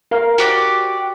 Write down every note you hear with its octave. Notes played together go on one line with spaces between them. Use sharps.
A#4 F5
F#4 G4 D5